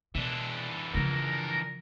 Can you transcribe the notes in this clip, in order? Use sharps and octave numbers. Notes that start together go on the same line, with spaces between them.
B2 E3 D4
C#3 F3 A#4